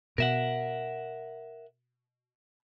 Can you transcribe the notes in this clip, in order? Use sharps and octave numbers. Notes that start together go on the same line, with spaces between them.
B2 A#4 E5 F#5